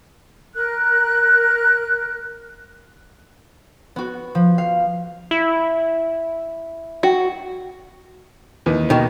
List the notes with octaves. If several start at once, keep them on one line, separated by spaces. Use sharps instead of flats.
A#4 F#6
B3 F#4
F3
F5
E4
F#4
D#2 E3 B4
B2 D#3